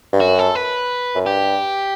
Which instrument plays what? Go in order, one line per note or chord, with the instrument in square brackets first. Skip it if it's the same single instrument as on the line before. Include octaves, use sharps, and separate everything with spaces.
[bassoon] G2
[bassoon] F#2 [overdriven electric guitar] F#4
[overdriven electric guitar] A4
B4
[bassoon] F#2
[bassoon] G2 [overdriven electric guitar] G4